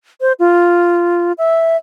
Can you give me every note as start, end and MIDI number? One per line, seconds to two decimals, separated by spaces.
0.21 0.32 72
0.39 1.32 65
1.38 1.77 76